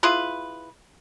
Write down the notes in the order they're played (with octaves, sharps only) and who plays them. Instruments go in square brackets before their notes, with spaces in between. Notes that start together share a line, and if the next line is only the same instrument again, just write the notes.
[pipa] E4 F4 G#4 B4